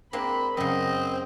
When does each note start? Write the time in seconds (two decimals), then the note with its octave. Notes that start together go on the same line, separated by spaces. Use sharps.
0.13 G#3 A#3 C4 D4 B5
0.57 F#2 C#3 C4 D#5